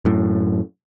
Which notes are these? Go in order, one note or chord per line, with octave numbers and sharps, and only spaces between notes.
F#2 A2